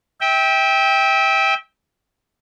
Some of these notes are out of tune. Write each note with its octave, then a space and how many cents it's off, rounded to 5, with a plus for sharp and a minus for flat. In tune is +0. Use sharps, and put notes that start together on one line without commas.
E5 -30 G5 +5